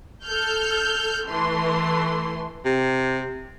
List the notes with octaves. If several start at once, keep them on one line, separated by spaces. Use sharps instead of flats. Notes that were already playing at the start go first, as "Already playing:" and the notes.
A4 F6 G6
E3 A3 C6
C3